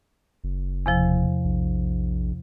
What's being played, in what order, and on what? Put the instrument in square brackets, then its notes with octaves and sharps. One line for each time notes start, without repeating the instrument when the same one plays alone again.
[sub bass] F#1
[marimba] E2 C3 F3
[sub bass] A#1